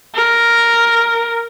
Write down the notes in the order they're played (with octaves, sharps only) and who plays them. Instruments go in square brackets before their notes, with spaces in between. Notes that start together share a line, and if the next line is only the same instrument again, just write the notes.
[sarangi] A#4